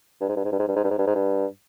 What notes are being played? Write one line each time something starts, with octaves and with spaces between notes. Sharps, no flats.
G2
G#2
G2
G#2
G2
G#2
G2
G#2
G2
G#2
G2
G#2
G2